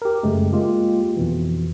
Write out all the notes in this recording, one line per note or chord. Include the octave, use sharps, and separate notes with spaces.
G4 A#4
F#2 C#3 G#3 A3
G#3 A#3 F4 G4
F2 B2 E3